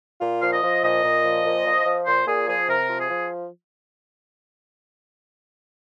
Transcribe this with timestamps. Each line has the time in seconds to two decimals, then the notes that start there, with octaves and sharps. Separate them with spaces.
0.21 A#2 F4
0.41 F3 F5
0.52 D#5
0.63 F3
0.83 A#2 D#5
1.04 A#2
1.24 F3
1.45 A#2
1.66 F3
1.86 F3
2.07 A#2 C5
2.27 A#2 G#4
2.48 F3 G#4
2.68 C3 A#4
2.89 F3
2.99 G#4
3.09 F3